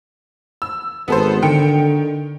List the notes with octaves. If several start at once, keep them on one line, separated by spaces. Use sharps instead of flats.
E6
G#1 B3 A4 C5
D3 D#3 G5 C#7